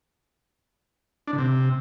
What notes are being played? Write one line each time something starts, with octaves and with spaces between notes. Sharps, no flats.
D4
D3
C3